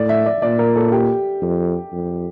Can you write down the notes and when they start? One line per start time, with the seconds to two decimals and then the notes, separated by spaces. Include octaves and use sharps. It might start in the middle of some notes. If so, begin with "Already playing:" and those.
Already playing: A2 D5
0.09 E5
0.26 D5
0.42 A#2 D5
0.59 A#4
0.76 A4
0.92 G4
1.42 F2
1.92 F2